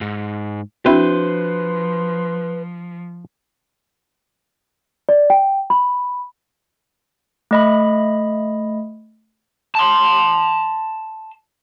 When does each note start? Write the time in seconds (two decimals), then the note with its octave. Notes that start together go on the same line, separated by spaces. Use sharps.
0.01 G#2
0.86 F3 C4 D4 E4 F#4 B4 C5
5.09 D5
5.30 G5
5.70 B5
7.51 A3 D#5 B5
9.75 A5 C6